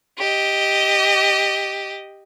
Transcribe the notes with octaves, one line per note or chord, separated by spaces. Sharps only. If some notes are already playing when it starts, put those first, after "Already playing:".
G4 D#5